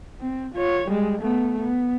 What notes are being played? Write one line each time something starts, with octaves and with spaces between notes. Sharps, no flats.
C4
F4 C#5
G3 G#3
A3 B3
B3